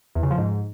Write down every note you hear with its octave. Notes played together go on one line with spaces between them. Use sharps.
E2
C#3
F3
G#2